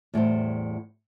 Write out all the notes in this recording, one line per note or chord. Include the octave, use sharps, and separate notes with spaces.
E2 A2 G3 C5